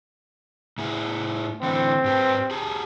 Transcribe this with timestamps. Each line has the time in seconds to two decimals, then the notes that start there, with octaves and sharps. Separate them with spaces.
0.78 A2 E4 G#4
1.63 D3 E3 A3 C4
2.04 G#2 G4 B4
2.51 G4 G#4 A5